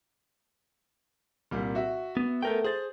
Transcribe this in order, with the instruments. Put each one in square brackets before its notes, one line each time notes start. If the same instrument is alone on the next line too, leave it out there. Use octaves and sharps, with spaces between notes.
[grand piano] C2 A#2 G3
F#4 E5
[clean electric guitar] B3
[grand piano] A3 G6 [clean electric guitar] B3 A#4 G5
[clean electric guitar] G#4 [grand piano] C5 A6